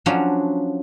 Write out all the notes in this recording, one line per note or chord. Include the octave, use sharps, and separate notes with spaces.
F3 F#3 C#4 D4 F4 F#4